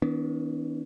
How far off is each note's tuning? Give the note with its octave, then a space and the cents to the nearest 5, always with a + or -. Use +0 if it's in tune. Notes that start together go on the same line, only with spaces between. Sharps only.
D#3 +35 B3 +0 D4 -45